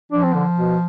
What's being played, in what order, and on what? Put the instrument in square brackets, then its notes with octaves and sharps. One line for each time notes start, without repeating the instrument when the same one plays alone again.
[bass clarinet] F3 [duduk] D4
[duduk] C4
D3
B2